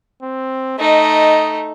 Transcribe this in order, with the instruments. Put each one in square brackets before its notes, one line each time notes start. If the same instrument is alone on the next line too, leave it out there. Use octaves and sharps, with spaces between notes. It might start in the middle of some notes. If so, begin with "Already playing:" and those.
[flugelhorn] C4
[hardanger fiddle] A3 D#4 [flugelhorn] D#5